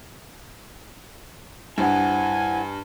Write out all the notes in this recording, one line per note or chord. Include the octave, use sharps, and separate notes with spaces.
G2 E4 C5 F#5 G#5